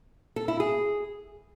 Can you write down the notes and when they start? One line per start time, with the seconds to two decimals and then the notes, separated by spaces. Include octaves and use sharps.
0.36 A4
0.48 E4
0.60 G#4